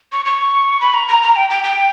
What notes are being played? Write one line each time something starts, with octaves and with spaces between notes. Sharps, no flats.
C#6
C#6
B5
A#5
A#5
A#5
G5
G5
G5